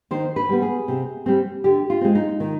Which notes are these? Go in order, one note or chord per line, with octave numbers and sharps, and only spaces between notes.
D#3 C5
B4
G3 B3
G#4
C3
G3 C4
D3 G4
F4
G#3 C4
D#4
D#3